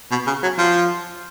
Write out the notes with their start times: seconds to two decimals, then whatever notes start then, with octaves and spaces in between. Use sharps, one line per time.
0.11 B2
0.27 C#3
0.43 F#3
0.58 F3